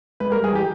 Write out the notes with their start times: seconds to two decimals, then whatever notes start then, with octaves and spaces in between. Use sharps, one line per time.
0.20 G#3 B4
0.32 A#4
0.35 G3
0.44 G#4
0.52 E3 G4